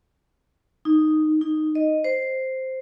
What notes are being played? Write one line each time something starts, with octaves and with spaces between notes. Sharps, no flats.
D#4
D#4
D#5
C5